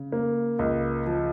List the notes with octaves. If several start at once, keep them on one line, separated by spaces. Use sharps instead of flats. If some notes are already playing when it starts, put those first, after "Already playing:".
Already playing: C#3
A#3
C#2
F3